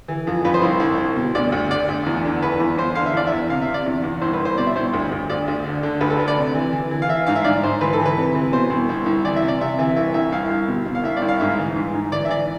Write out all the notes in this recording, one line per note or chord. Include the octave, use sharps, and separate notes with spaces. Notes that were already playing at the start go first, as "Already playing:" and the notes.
E3
F2
F2 B4
C5
C2
C2
C2
B2
D2 D5
D2
D2 D5
D2
E2
D3
E2 B4
E2
E2 C5
D3 F5
E5
E2 D5
E2 E5
C3 F5
E5
C3
D5
E2
E2
C2 C5
B4
C2 C5
B2 D5
E5
C2 C5
D2
D2
D2 D5
D2
D3
D3
D2 B4
A4
D3 B4
D5
C3
E3
E3
E3
F5
E3 E5
G#2 F5
E5
G#2 D5
G#2 C5
E3 B4
A4
E3
B4
C3
E3
B2 C5
C2
C2
C2
E3 D5
E5
C3
D5
C3 E5
E3 E5
C2 E5
C2 E5
C2 F5
C2
B2
C2
F5
C2 E5
D5
C2
F5
G#2 E5
E3
G#2
G#2
E3 D5
E5
E3 D5